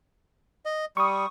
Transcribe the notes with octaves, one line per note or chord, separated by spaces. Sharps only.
D#5
G3 C#6 D#6